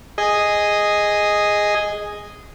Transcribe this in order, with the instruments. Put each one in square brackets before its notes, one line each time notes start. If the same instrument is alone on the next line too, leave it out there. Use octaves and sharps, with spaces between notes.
[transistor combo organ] G#4 D#5